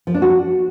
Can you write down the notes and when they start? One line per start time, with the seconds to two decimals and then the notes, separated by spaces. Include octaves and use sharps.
0.07 F3
0.14 D4
0.22 F#4